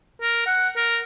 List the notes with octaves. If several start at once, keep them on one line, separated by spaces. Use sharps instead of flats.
A#4
F#5
A#4